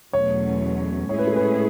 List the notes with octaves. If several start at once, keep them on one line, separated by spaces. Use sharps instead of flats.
E2 B2 F#3 A3 C#4 C#5
A2 G#3 C#4 E4 G#4 C#5
B4
A4
B4